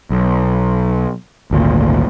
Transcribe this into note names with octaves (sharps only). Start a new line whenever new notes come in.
B1
G#1 D2 A#2